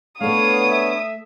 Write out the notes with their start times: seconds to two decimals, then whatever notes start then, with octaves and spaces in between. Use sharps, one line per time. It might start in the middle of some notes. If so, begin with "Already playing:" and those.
0.21 A3 B3 D4 A4 C#5 F5 D#6
0.71 E5